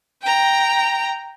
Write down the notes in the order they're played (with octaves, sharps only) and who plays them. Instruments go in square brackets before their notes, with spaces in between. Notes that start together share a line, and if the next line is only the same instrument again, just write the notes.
[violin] G5 A#5